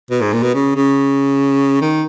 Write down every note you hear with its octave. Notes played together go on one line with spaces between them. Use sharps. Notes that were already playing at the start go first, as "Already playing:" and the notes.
B2
G#2
A#2
B2
C#3
C#3
D#3